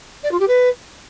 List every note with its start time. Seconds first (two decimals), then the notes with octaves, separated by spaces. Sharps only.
0.23 D5
0.31 F4
0.39 G4
0.48 B4